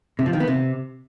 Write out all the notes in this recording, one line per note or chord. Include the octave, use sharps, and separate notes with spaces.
C3
F3
D#3
B3
C3